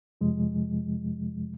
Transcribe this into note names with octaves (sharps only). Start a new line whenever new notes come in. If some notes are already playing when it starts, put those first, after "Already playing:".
F2 C3 F3 G#3